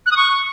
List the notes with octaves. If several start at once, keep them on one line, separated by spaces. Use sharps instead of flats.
F#6
D#6
C#6